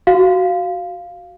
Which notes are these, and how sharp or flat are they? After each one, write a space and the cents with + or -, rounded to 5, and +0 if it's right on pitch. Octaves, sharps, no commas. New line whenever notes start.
F#4 +10 F5 +0